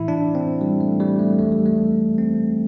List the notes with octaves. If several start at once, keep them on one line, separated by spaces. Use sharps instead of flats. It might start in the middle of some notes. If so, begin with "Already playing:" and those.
Already playing: A2 E3 E4
D4
C4
G3
A3
G3
A3
E2 E3 A3
G3
A3
C4